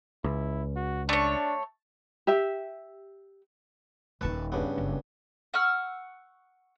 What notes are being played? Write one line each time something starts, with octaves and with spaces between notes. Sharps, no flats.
C#2 E4
F#4
A3 D4 C#5
G4 E5
D#1 D#3 B4 A5 C#6
G2 C#3 B3
F#1
F#5 C#6 E6 F6